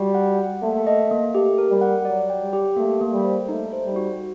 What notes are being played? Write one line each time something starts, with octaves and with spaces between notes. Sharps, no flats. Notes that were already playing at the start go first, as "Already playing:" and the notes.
Already playing: G3 F#4
F#5
F#5
A3 A#3
D#5
A#3
A3 G4
A#4
G3
F#5
F#3 D5
G5
G3
G4
A3 A#3
A#3
G3
C5
A3 D#4
C5
G3
F#4